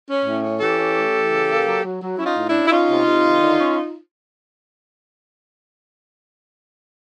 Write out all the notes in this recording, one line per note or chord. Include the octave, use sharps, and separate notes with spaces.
C#4
A2
C#4
E3 G4 A4
C#4
A3
E3
C#3
A#3
F#3
F#3
F#3
C#4 E4
D#4 F4
A2
D4 E4
C#4
E4
C#4 D#4 F4
C3
C3
D#3
D3
C#4